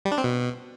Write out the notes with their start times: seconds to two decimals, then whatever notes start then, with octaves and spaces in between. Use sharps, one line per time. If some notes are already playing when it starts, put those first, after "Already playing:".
0.05 G3
0.12 D4
0.18 C4
0.24 B2